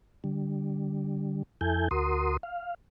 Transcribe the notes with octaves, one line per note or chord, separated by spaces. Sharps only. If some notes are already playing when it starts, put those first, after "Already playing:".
D3 G3
F2 E4 A4 G#5 G6
D2 F#4 A#4 C6 D#6
F5